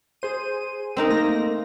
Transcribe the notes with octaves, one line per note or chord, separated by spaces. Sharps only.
G#4 C5 D#7
C4 D#4 A#4
A3 A#3 A#6